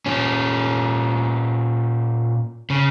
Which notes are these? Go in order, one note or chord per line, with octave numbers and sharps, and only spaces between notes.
A#2 C#4
C#3